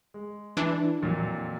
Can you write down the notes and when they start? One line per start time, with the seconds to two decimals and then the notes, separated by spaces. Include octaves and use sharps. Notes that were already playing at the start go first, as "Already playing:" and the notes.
0.14 G#3
0.57 E3 D4
1.02 F2 A#2 F#3